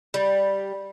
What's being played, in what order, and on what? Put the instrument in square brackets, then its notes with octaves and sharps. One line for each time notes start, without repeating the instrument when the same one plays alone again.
[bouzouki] G3